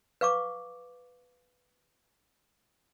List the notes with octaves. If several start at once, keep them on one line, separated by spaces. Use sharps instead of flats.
B4 F5 C#6 D6